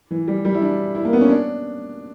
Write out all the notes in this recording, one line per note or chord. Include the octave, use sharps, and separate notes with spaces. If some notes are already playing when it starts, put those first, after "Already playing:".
E3
G3
G3
E4
D4
E4
A#3
B3
C#4
D4